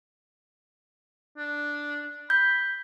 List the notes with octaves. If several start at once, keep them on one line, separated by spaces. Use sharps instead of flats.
D4
B5 G6